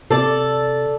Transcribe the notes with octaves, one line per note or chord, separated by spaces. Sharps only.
C3 A4 D5